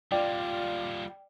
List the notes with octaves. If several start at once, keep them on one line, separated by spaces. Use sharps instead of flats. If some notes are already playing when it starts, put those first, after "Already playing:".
G3 A#3 F4 D5 G5